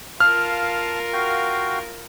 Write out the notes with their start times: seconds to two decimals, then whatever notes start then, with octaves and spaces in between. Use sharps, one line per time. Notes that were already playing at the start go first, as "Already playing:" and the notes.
0.20 F4 A#4 F5 A5 F6
1.13 F#4 F5 G5